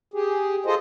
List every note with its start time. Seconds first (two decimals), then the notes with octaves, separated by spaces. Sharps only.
0.14 G4 G#4
0.66 F4 G#4 A4 C5 D#5